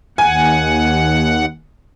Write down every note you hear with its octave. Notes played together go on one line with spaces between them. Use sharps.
D#2 F#5 G#5